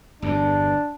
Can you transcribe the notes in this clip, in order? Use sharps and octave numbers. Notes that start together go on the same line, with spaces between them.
G1 E2 G2 D4